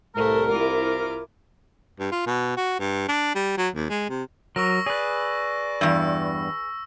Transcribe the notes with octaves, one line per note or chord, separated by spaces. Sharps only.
C2 A2 A3 A4 A#4
E4 F4 D6
G2
F4
B2
F#4
G2
D4
G3
F#3
D#2
G#3
C3
F#3 A#4 C#6 E6 A#6
G#4 B4 D5
E2 G2 E6